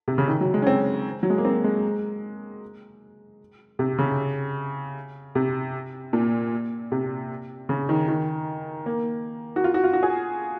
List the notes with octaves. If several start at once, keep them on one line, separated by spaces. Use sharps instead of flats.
C3
C#3
D#3
F#3
G#3
C#4
C4
F#3
G#3
A#3
C4
G#3
C3
C#3
C3
A#2
C3
C#3
D#3
D#3
A#3
F#4
F4
F#4
F4
F#4
G#4